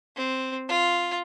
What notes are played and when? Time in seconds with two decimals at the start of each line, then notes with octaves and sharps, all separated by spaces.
0.16 C4
0.69 F4